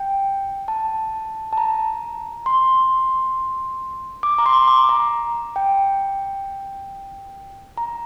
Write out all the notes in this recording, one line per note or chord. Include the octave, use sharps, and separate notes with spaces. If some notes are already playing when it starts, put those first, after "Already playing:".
Already playing: G5
A5
A5
A#5
C6
D6
A#5
C6
D6
A#5
G5
A#5